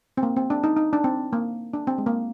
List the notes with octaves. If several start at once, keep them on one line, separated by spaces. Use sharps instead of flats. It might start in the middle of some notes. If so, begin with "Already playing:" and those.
C4
A#3
C4
D4
D#4
D#4
D4
C4
A#3
D4
C4
G#3
A#3